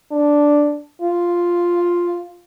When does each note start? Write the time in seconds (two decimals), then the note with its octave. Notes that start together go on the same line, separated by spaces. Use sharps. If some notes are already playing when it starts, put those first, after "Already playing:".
0.12 D4
1.02 F4